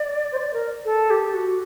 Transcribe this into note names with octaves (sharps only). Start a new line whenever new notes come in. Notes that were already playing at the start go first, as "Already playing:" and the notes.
Already playing: D5
C5
D5
A#4
A4
G4
F#4